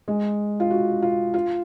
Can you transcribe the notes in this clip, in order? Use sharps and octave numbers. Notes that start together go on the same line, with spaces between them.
G#3
F4
F#4
F4
F4